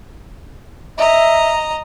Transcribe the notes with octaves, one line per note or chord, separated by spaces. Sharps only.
D#5 E5 A#5